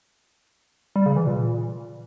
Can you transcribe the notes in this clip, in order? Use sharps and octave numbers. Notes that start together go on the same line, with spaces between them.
G3
C#3
E3
A#2